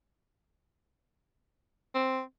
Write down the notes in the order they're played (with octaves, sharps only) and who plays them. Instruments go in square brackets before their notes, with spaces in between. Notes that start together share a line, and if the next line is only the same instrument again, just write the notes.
[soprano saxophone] C4